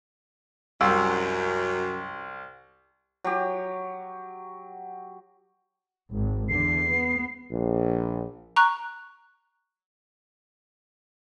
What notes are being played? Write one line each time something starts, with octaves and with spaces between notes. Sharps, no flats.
C2 F#2 E6
F#3 G4
G#1
E2 D3 C7
B3
A#1
A#5 C#6 F#6